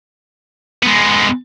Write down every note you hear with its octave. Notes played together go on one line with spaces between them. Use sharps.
G#3 B3